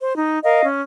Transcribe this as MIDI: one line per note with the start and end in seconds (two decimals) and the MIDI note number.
0.01 0.15 72
0.16 0.38 63
0.44 0.65 70
0.44 0.65 75
0.44 0.65 77
0.65 0.80 61